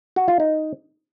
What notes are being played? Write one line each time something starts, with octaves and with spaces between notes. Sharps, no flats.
F#4
F4
D#4